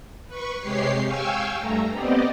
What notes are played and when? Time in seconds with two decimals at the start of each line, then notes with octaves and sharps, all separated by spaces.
0.28 B4 C#6
0.60 C3 G#3 G4 C#5 C7
1.04 F5 G5 G#5 C#6 E6
1.58 G2 A3 A#5
1.92 B3 C4 G4 D5 D#5